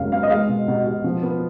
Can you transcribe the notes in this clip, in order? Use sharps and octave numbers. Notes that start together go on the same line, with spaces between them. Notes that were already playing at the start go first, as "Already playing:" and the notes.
Already playing: F#2 C#3 G#3 F5
B3 F5
D#5
G#3 F5
B2
B2
B2
F3
B3